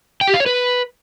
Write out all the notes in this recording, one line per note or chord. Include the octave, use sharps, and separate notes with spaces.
G5
G4
F5
C#5
B4